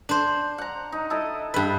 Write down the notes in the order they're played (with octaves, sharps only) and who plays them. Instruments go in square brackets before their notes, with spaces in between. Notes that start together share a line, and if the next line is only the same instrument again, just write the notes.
[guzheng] D4 C5
[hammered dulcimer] F#5 A#5
D#4
E4 A4 D#5
[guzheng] G2 B4